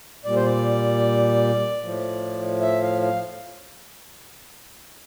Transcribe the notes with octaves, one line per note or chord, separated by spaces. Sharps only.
A#2 G3 D5
C5
D5
A2 F3
E5
F5
F5